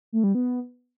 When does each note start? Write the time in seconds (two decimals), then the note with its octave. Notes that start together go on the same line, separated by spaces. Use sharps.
0.12 A3
0.24 G3
0.35 B3